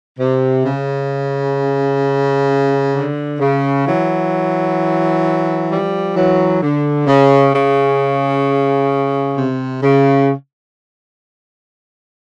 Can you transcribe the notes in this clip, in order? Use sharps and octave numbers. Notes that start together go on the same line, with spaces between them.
C3
C#3
D3
C#3
E3 F#3
F3 G3
E3 F#3
D3
C#3
C#3
C3
C#3